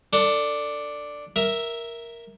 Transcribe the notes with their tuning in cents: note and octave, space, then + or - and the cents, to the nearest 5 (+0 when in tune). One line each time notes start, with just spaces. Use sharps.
D4 +0 A4 +30
A#4 +0 E5 +0